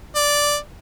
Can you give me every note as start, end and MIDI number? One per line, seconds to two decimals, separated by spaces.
0.15 0.57 74